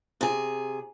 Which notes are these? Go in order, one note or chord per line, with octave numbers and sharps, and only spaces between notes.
C3 G#4